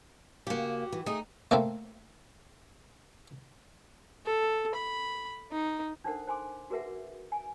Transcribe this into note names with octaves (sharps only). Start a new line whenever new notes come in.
C#3 A#3 F#4 G4
E3
A3 D#4 G#4
A3 A#3 C4
A4
B5
D#4
D4 D#4 A4 A#4 C5 F#5
C5 G#5 C6 D6
F#4 G#4 A#4 B4 E5 F#5
G#5